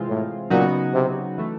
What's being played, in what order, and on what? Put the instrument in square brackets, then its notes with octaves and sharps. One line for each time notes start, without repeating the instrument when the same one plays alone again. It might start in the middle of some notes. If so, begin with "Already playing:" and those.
Already playing: [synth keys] C3 E3 G#3 C4 F4
[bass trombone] A2
[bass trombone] A#2 [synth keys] C#3 F#3 B3 D#4 F#4
[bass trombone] C3
[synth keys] E3 A3